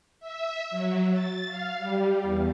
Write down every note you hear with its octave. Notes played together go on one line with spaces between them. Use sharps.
E5
F#3
A6
F5
G3
E2